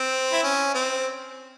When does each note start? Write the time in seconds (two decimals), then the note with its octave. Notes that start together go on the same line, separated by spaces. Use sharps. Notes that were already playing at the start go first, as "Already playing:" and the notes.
Already playing: C4
0.33 E4
0.43 C#4
0.74 C4